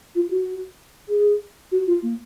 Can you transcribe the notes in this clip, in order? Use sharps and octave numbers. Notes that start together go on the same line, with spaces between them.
F4
F#4
G#4
F#4
F4
A#3